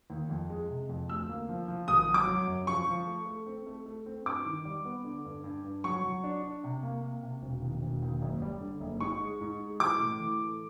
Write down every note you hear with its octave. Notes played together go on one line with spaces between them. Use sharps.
D#2
F2
G#3
C3
F2
D2 E6
A#3
F3
F3
G#1 D#6
F#3
D6
F#3
F#2
F3 C#6
F3
A3
A3
C4
A3
A3
C4
G2 D6
D#3
G3
B3
D3
G2
G2
G2
F#3 C#6
F#3
D4
D4
C3
A#3
A#3
C3
E1
D#2
E1
D#2
F#1
G3
D3
F#1
G#2 C#6
G#3
G#2
G#3
E3 D6
A2
E3
A3